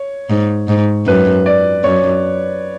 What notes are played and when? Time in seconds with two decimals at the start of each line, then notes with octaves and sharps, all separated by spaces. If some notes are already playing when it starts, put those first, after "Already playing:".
Already playing: C#5
0.30 G#2
0.68 G#2
1.07 F#2 B4
1.46 D5
1.84 F#2 C#5